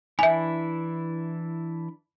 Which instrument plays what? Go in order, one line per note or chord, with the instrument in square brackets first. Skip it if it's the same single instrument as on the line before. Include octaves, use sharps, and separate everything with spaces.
[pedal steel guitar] E3 D4 E4 [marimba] E5 G#5